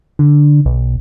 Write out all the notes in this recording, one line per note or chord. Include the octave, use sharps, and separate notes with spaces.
D3
B1